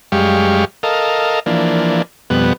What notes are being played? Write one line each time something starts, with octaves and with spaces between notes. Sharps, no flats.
F#2 G3 G#3 G4 F5 C#6
A4 A#4 D#5 F5
E3 F3 A#3 D4
F2 B2 G3 B3 F#5